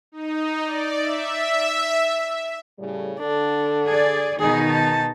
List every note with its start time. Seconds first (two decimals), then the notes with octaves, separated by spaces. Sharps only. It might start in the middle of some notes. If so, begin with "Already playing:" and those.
0.12 D#4
0.64 D5
1.02 E5
2.79 A2 C#3 G3
3.20 D3 D4 A4
3.86 G#4 D5
4.39 B2 D#3 D#4 G#4
4.70 A5